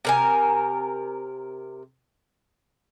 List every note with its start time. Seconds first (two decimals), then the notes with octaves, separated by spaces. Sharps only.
0.05 C3 A#4 G#5